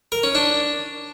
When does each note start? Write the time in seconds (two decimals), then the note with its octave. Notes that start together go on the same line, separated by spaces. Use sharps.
0.12 A#4
0.23 C#4
0.35 D4